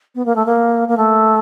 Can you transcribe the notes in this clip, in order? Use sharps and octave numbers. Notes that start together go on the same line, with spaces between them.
B3
A#3
A3
A#3
A#3
A3